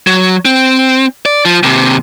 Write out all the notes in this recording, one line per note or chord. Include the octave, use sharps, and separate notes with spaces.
F#3
C4
D5
F3
D#2 C3